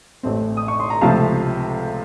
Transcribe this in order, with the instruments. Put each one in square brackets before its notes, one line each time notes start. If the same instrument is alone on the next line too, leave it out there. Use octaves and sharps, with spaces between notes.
[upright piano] A1 A2 A3 C4
D#6
C#6
C6
A#5
C#2 C3 F3 A3 C4 F5 A5